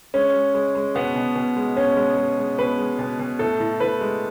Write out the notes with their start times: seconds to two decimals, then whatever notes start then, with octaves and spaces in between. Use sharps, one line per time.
0.14 G#3 C#4
0.34 G#3
0.54 G#3
0.75 G#3
0.95 B2 B3
1.16 B2
1.35 B2
1.56 G#3
1.76 B2 C#4
1.97 G#3
2.17 G#3
2.37 G#3
2.58 B2 B4
2.78 G#3
2.99 B2
3.19 B2
3.39 A2 A4
3.60 A2
3.80 A2 B4
4.01 G#3